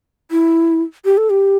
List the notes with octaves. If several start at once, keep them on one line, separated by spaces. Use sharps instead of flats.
E4
G4
A4
G4